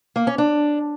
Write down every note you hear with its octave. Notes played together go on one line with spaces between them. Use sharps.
A#3
C#4
D4